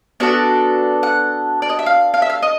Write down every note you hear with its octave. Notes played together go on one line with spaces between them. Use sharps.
B3 D4 F#4 A4 D5
F#5
D5
D#5
E5
F5
F5
E5
F5
D#5